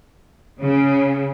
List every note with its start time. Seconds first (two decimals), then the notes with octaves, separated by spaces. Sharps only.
0.60 C#3